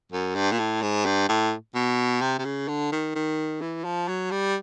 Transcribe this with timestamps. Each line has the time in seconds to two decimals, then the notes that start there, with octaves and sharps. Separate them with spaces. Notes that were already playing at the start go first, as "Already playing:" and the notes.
0.12 F#2
0.35 G2
0.52 A#2
0.59 A2
0.82 G#2
1.05 G2
1.29 A2
1.75 B2
2.21 C3
2.39 C3
2.45 C#3
2.68 D3
2.92 D#3
3.15 D#3
3.61 E3
3.84 F3
4.08 F#3
4.31 G3